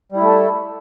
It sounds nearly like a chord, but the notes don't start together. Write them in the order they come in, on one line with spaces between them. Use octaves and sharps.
G3 E4 A3 A4